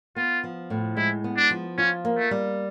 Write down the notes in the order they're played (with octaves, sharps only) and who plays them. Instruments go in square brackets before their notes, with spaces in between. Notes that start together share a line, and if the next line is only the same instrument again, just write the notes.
[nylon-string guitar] B3 [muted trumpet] F4
[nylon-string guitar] F3
A2
[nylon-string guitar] G#3 [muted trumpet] E4
[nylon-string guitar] B3
[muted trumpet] D4
[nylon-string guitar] F3
[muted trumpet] C#4 [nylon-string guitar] F4
[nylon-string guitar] A#3
[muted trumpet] A3
[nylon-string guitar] G3